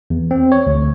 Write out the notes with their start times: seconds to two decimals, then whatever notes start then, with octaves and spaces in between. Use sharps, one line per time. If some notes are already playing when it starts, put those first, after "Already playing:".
0.10 E2
0.31 C4
0.52 C#5
0.67 D2